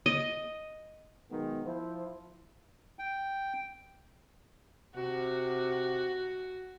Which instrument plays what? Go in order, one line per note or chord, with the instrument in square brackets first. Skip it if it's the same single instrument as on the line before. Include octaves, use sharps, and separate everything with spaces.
[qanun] D#5
[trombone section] B1 D#3 G#3 B3
F3 E4 C5
[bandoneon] G5
[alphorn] C3 [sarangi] F#4